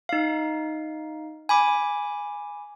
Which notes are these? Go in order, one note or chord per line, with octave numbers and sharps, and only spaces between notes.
D#4 F5
G#5 B5 D6